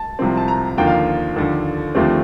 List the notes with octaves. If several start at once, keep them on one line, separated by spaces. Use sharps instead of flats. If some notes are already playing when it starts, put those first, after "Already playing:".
Already playing: A5
C2 C3 F3 C4
A5
A#5
D#2 D3 F3 A#3 G5
F5
D#2 D3 F3 A4
D#2 D3 F3 A3 C4 G4